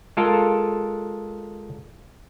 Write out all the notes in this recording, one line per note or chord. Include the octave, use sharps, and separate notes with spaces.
G#3 F4 A4 A#4